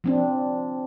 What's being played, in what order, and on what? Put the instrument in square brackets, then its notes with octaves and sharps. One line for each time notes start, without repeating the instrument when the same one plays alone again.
[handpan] F3 C4 D4